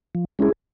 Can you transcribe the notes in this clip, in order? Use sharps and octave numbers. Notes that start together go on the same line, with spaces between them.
F3
G#3 C#4 E4 G#4